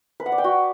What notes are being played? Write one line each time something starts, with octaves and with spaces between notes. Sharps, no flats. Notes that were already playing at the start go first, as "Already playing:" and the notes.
B4
F#5
D5
G5
F#4